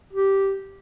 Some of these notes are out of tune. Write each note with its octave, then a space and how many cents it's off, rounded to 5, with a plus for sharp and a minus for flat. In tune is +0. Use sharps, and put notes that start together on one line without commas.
G4 -10